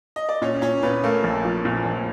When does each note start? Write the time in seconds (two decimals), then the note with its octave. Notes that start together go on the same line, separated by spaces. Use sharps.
0.16 D#5
0.29 D5
0.42 A#2 C#4 C#5
0.62 A#2 C#4 C#5
0.82 A#2 B3 B4
1.04 A3 A#3 A#4
1.24 A#1
1.45 F3
1.65 A#2
1.85 A#1